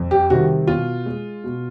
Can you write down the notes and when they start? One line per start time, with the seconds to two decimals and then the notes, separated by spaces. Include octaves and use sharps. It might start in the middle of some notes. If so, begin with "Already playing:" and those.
Already playing: F2
0.11 G4
0.30 C3 D#3 G3 F#4
0.67 B2 F4
1.06 G#3
1.44 B2